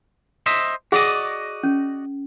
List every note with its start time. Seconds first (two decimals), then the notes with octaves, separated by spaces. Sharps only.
0.46 C5 D#5 E5
0.92 F#4 G#4 D5 D#5 F#5
1.63 C#4